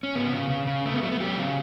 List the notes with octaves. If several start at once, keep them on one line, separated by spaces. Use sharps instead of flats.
C#4
C#3 B3
C#3
C#3
C#3
A3
B3
F#3 A3
B3
F#3 G4
C#3